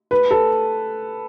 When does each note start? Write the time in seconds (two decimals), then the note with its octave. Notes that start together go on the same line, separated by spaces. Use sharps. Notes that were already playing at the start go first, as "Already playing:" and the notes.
0.11 B4
0.31 A4